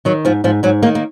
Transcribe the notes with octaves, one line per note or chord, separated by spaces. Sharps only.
D#3 F#3
G#2 F3
G#2 F3
G#2 F#3
D#3 A#3
A#3